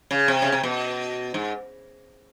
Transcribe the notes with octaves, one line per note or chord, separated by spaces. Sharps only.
C#3
C3
C#3
C3
B2
G#2